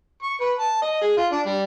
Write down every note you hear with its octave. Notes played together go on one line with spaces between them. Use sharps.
C#6
B4
A5
D#5
G#4
F4
D4
G3